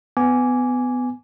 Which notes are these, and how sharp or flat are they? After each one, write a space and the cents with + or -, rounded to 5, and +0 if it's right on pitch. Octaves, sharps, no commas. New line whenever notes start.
B3 +20 G#5 +0 D6 -15